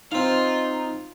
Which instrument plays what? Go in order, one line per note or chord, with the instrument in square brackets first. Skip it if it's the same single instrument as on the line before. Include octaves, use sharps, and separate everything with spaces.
[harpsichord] C4 F5 [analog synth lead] D#4 [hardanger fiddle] F4